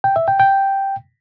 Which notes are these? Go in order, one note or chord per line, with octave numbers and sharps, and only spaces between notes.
G5
E5
G5
G5